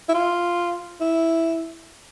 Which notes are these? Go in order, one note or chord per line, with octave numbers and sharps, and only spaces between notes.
E4
F4
E4